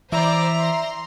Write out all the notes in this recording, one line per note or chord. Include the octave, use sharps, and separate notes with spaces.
E3 C5 D5 E5 A#5
C6